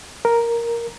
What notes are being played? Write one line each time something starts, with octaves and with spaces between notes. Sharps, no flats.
A#4